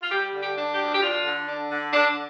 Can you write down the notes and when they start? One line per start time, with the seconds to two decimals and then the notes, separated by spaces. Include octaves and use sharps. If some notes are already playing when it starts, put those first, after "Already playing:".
0.03 F4
0.12 G3 G4
0.34 D3
0.42 G4
0.57 D4
0.72 G4
0.79 D2
0.95 G4
1.03 D4 F4
1.25 D3
1.48 D4
1.71 D3
1.93 D3 D4